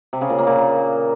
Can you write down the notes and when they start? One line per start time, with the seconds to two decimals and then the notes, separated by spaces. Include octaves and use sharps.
0.13 C3
0.21 C#3
0.30 A#2
0.38 A#3
0.47 A#2